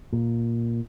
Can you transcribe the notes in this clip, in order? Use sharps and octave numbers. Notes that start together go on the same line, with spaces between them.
A#2